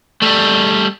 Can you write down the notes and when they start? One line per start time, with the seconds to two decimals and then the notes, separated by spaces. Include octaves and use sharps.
0.22 G3 A3